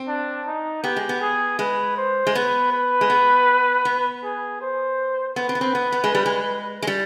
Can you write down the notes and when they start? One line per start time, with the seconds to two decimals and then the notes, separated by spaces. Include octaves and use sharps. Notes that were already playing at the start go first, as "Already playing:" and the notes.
Already playing: C4
0.08 D4
0.47 D#4
0.84 B3 G4
0.96 G#3
1.09 B3
1.22 G#4
1.59 G#3 B4
1.97 C5
2.27 G#3
2.35 B3 B4
2.73 B4
3.01 G#3
3.10 B3
3.85 B3
4.24 G#4
4.62 C5
5.36 B3 B4
5.49 C4
5.55 B3
5.61 C4
5.75 B3
5.92 B3
6.04 G#3
6.15 G3
6.26 G#3
6.82 G#3
6.87 G3